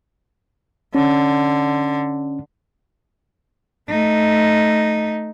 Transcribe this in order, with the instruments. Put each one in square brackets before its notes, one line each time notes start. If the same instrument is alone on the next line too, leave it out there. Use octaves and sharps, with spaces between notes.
[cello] D3 [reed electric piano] C#4
[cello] A3 D#4